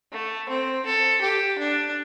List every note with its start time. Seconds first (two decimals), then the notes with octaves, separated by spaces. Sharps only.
0.12 A3
0.49 C4
0.86 A4
1.21 G4
1.58 D4